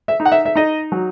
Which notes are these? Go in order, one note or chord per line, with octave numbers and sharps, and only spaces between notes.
E5
D#4
F#5
E5
E5
D#4 D#5
F#3